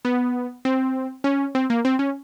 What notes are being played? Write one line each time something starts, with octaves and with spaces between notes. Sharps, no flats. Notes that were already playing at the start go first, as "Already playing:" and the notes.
B3
C4
C#4
C4
A#3
C4
C#4